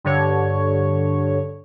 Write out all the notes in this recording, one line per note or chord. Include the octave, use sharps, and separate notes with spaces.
G2 D3 C#5